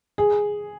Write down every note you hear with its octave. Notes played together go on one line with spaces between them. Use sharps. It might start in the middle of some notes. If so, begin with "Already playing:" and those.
G#4